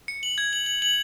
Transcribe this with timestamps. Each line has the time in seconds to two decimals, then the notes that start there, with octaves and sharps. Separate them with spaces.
0.08 C#7
0.23 F#7
0.38 G#6
0.53 F#7
0.66 F#7
0.82 F#7